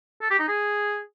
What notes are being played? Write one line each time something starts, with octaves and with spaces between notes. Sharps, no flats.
A4
G4
D#4
G#4